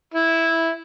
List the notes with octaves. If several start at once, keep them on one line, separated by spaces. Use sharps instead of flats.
E4